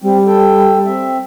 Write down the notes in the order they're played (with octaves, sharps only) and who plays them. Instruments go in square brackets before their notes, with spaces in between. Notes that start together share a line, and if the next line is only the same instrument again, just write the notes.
[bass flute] G3 [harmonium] C4
[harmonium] A4 G5
C4 E5